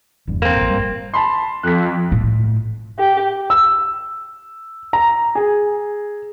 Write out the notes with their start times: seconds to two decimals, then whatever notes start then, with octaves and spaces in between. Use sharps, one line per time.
0.27 F1 E2 G2
0.42 A#3 C4
0.57 A1 G2
0.70 G1 G3
1.14 A5 B5 C6
1.63 F2 F#6 B6
2.12 A2
2.99 G4
3.50 E6
4.93 A#5
5.35 G#4